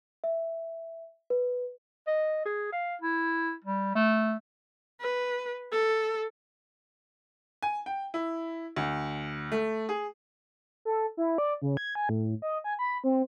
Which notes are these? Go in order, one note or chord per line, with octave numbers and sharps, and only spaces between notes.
E5
B4
D#5
G#4
F5
E4
G3
A3
B4
A4
G#5
G5
E4
D2
A3
G#4
A4
E4
D5
C#3
G#6
G#5
A2
D#5
G#5
B5
C4